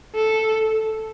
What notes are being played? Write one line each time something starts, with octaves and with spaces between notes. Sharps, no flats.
A4